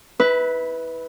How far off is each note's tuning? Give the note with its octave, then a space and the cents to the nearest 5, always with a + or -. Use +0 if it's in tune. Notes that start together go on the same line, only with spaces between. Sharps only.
E4 -30 B4 +0